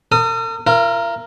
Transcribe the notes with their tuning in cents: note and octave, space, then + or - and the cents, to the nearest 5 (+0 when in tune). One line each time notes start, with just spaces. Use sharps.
A#4 -45 D#6 +0
F4 -45 A#4 +0